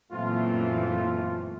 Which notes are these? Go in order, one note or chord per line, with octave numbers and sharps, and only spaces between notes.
F#2 A#2 E3 A3 C4 F4